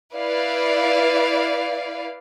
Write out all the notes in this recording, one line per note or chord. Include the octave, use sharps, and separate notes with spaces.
E4 B4 D5 F5